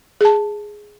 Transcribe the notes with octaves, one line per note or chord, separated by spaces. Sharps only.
G#4 A5